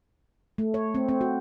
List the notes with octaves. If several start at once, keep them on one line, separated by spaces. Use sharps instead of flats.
A3
C#5
C4
C4
F#4